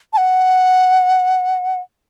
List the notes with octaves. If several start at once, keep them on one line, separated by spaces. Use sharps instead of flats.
A5
F#5